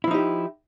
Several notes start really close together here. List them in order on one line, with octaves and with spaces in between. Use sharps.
E4 F3 D#4 G4